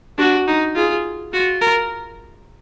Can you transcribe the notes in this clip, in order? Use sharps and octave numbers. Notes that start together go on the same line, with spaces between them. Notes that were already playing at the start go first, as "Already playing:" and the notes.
D4 F#4
D#4
F4 G#4
F4 F#4
A#4